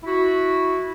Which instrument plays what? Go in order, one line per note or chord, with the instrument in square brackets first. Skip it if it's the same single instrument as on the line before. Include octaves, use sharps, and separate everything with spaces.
[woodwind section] E4 F#4